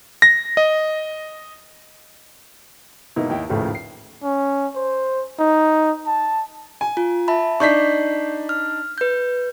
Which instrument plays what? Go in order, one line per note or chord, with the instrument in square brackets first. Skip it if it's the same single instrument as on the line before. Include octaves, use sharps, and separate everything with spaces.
[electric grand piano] A#6
D#5
[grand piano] G#2 B2 A#3 D#4 E4
D#2 D#4 E4 G5
A1 D#2 A2 C#3 F3 A3
C7
[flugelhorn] C#4
C5
D#4
A5
[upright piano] G#5
[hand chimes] F4
E5 A5 B5
[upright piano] D4 D#4 B6 [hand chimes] C#6 G6 C7
[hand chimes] F6
B4 G6